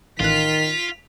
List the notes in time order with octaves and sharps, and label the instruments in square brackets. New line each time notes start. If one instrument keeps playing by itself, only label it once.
[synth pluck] A1 F#6 [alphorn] D#3 [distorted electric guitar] F4 [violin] B6 F7